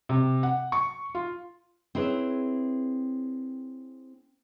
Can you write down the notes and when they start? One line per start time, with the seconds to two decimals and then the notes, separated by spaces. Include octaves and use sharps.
0.09 C3
0.43 F#5
0.72 C#6
1.15 F4
1.95 C4 E4 G#4 B4 C#5